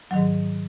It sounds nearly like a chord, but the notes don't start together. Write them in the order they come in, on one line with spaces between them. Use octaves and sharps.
F#3 D#3 G#2